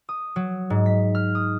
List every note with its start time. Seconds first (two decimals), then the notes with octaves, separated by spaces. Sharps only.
0.09 D#6
0.36 F#3
0.70 G#2
0.86 B6
1.15 F6
1.35 D#6